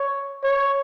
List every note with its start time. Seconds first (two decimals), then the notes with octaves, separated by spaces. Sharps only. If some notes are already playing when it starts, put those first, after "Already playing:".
Already playing: C#5
0.43 C#5